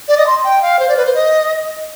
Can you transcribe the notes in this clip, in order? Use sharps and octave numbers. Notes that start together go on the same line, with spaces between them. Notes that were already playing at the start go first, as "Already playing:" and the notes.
D5
D#5
C6
G5
F5
C5
D5
B4
C5
D#5